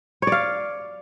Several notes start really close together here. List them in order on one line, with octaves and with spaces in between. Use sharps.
C#5 D5 F5